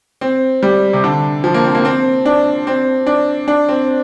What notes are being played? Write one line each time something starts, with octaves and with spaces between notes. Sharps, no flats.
C4
G3
C3
D3
F3
A#3
C4
A#3
C4
D4
C4
D4
D4
C4